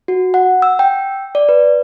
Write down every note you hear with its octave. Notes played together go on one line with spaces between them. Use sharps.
F#4
F#5
E6
G5
D5
B4